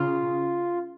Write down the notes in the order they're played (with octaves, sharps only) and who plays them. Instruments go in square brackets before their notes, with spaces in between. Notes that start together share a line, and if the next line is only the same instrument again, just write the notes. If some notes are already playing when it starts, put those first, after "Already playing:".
Already playing: [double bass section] C#3 [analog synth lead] F4